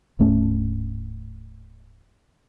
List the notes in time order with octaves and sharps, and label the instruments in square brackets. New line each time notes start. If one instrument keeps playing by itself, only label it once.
[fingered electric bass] D1 G#2 A3 C#4